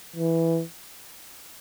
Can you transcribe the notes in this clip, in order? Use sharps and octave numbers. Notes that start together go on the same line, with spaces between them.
E3